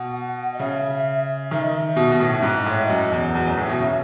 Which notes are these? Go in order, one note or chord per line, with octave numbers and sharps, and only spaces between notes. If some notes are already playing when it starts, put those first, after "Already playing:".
Already playing: B2 F#5
D#5
C#3 E5
D#3 E5
D#5
E5
B2
B2
A2
G#2 E5
D#5
A2 C#5
D#5
F#2
E2
E2 F#4
F#2
E4
A2 F#4
B2
C#3 E5